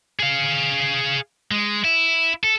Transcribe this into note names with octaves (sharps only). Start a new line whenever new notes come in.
G#4 F5
G#3
E4
A4